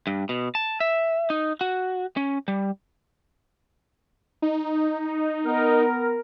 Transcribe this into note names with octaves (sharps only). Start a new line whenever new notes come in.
G2
B2
A5
E5
D#4
F#4
C#4
G3
D#4
B3 A#4